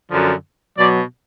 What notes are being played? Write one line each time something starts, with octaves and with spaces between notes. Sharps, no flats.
F#2 D3 F3
B2 F#3 D5